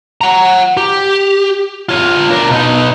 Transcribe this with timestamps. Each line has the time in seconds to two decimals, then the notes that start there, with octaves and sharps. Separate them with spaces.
0.21 F#5 A#5
0.77 G4
1.89 F4 C#5
2.30 D4 A#4
2.50 B2 D#4